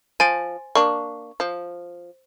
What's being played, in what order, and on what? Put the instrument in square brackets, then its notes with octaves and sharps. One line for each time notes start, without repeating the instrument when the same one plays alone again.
[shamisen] F3 [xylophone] G#5 A6 D7
[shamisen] A#3 D4 [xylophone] C#6
[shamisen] F3